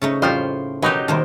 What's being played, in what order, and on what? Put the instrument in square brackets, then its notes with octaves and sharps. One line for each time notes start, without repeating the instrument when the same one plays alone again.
[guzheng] C#3 A3 D#4
[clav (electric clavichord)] F2 F3 G3 [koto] A2 F4 C5
[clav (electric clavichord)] B2 D#3 [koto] F#3 D#4 G4 [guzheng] D#5
[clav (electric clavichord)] C2 A5 [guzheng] D#3 A#3 C5